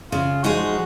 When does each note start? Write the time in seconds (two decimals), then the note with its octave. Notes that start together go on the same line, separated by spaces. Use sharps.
0.11 C#3 F4
0.43 F3 G#3 D#4 F#4 G#4